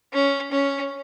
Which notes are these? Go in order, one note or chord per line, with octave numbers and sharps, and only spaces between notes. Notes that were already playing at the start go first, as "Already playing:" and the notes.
C#4
C#4